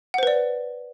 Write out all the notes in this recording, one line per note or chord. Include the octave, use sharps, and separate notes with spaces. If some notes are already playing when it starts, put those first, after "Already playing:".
B4 C5 D5 F#5